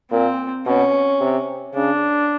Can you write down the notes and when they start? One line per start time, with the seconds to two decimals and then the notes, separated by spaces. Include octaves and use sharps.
0.11 A#2 C4
0.66 B2 C#4
1.20 C3
1.74 C#3 D4